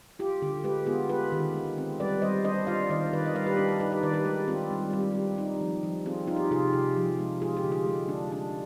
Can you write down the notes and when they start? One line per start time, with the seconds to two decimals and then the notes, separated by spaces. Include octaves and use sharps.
0.19 F4 G4
0.42 D3 G4
0.64 G#3 G4 B4
0.86 B3 F4 G#4
1.09 F4 G4 B4
1.32 D#3
1.54 G#3
1.78 C4
2.00 G3 B4 D5
2.22 G3 C5 D#5
2.44 D4 C5 D#5
2.67 F4 D5 F5
2.90 D#3 C5 D#5
3.13 D#3 B4 D5
3.26 D#5
3.35 G3 D5 F5
3.46 G4 B4
3.58 D4 G4
3.69 G4
3.80 D#4 G4 B4
3.92 B4 D5
4.03 D#3 B4 D5
4.14 G4 B4
4.25 G#3 G4
4.48 C4 F4
4.71 G3
4.93 G3 G4
5.15 C4
5.38 D#4
5.61 F3
5.83 F3
6.06 C4 F4 G#4
6.28 D#4 F4
6.36 G4
6.51 C3 F4 G#4
6.73 C3 G4
6.96 F3
7.19 G#3
7.42 F4 G#4
7.57 G4
7.64 D3
7.72 F4 G#4
7.86 G#3
8.09 D4
8.32 D4